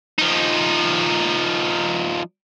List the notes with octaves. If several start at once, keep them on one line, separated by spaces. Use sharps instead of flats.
F3 D#4